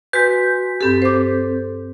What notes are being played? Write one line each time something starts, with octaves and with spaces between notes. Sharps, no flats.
F#4 B4 G#5 C6 G6 B6
G2 C4 G4 A4
C5 D6